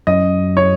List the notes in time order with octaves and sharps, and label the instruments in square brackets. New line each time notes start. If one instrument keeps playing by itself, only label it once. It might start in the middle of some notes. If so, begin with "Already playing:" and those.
[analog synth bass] F#2 [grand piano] D#5
[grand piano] C#5